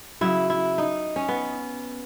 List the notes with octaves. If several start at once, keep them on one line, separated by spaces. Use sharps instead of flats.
C#3 F#3 E4
E4
D#4
C#4
B3